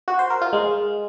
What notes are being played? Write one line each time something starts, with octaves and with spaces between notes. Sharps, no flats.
F#4
C5
A#4
F4
G#3